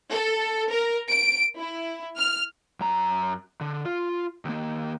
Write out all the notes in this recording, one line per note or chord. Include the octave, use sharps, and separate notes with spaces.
A4
A#4
D7
E4
F6
F#2 A#5
D3
F4
D#2 A#3